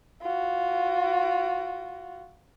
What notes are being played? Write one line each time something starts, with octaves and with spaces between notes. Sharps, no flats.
F4 F#4